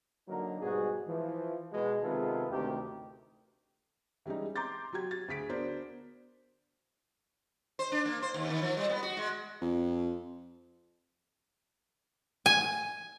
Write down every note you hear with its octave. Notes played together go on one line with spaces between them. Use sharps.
D3 F#3 A#3 D#4 A#4
G#2 B2 G3 F#4 G#4
E3 F3
B2 G#3
C3 D#3 G#3 B3 F4 A4
A1 D2 C3 D#3 G4
E3 G3 G#3 C#4 D#4
A#5 C6 D6 G6 A6
F#3 F#4 G4 G#6
A6
D2 G#4 B6 D7
B3 D4 F#4 A#4 C5
C5
D4
A#3
C5
D#2
D#3
F3
G3
B3
F#4
G#3
F2
G#5